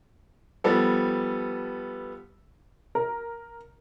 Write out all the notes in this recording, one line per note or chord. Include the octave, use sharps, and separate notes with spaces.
F3 G3 B3 A4
A#4